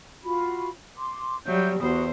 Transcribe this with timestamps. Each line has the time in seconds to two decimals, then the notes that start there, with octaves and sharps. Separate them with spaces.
0.23 F4 F#4 B5
0.98 C6 D6
1.46 F#3 G3 E5 G6
1.80 E2 F#4 C5 B5 D#6